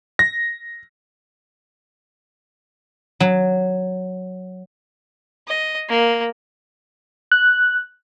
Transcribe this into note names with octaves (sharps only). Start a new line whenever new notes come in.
A#6
F#3
D#5
A#3
F#6